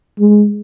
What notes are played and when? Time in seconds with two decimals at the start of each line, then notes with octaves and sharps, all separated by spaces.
0.20 G#3